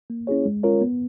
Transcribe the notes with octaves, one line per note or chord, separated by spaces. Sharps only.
A#3
C#4 E4 G#4 C#5
G#3
C#4 F4 A#4 C#5
B3